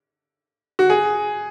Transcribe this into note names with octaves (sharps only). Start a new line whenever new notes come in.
F#4
G#4